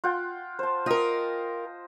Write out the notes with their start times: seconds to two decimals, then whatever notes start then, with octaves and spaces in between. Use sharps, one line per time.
0.04 F4 F#5 G5
0.59 C5 A5
0.86 F4 A#4 D#5 G5